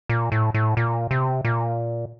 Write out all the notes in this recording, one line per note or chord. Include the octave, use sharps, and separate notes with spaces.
A#2
A2
A2
A#2
C3
A#2